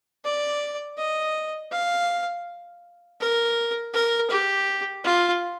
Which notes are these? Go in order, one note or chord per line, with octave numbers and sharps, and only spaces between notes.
D5
D#5
F5
A#4
A#4
G4
F4